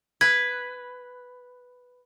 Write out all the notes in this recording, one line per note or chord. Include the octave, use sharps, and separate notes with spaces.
B4 G#6